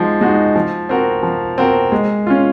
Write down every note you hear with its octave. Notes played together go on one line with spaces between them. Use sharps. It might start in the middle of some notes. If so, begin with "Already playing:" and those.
Already playing: F3 G#3 D#4 F#4
G#3 D#4 F#4
F3
C4 F#4 A#4
F3
C4 F#4 A#4
G#3
C#4 F4